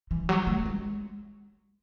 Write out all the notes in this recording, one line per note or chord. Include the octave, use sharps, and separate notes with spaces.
E3
F#3
A3
G#3